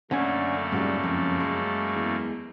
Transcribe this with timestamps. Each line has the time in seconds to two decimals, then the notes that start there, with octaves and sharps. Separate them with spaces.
0.11 F#2 D3 A3 A#3 C#4 G#5
0.72 C#2 G#2 F#3 G3
1.03 F2
1.40 G#3
1.95 E2